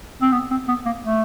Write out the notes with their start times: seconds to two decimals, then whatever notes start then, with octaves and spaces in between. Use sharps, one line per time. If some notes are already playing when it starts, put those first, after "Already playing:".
0.22 C4
0.32 B3
0.51 C4
0.68 B3
0.86 A#3
1.03 A3